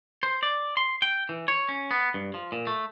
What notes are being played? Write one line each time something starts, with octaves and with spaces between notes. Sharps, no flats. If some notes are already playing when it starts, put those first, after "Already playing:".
C5
D5
C6
G5
E3
C#5
C#4
B3
G2
F3
A#2
A3